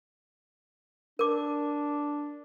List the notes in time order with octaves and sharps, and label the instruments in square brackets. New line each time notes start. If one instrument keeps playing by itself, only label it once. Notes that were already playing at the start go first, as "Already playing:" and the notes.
[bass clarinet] D4 [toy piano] A#4 D6